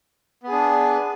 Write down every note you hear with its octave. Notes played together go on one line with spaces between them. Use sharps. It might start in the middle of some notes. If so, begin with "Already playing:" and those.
B3 D4 G#4